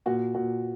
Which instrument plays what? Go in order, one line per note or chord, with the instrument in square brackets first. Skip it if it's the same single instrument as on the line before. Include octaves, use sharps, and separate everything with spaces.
[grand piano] A#2 F#4
A#2 F#4